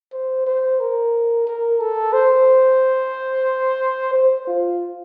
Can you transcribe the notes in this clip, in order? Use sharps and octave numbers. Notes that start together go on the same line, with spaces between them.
C5
C5
A#4
A#4
A4
C5
C5
F4